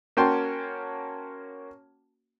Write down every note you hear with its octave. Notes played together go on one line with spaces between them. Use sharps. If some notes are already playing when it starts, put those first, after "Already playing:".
A#3 C#4 F#4 G5 A5 C6